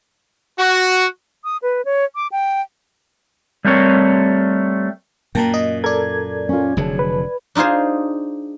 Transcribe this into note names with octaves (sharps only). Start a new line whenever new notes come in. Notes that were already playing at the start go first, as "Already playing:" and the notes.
F#4
D#6
B4
C#5
D6
G5
G3 A3 C4 A#4 C#5
F#2 A#2 A#3 G5 A5 A#5
D#5
A4 A#4 D5 G#6
C#4 F4
F1 D3 F#3 G#4 C#5 A5
B4
D4 D#4 F4 G#4 C5